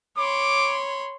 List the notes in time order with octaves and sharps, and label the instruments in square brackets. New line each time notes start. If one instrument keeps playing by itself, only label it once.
[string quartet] C#5 B5 C6 [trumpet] D6